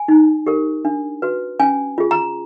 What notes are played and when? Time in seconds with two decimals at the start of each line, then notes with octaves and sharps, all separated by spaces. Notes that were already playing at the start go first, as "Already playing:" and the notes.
Already playing: G#5
0.08 D#4
0.47 G4 A#4
0.85 D4
1.22 F#4 B4
1.60 C#4 G#5
1.98 F4 G#4
2.11 A#5